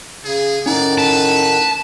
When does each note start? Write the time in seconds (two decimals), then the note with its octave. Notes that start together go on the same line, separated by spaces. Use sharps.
0.24 C#3 G#4
0.66 A2 D#3 C#4 D#4 D5 F#5
0.98 B4 A5